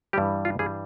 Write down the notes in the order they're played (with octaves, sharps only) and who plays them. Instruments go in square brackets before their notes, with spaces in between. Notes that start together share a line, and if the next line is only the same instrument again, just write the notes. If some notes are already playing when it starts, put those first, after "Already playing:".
[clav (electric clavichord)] G2 E3 G3 G4
F4
G2 E3 G3 G#4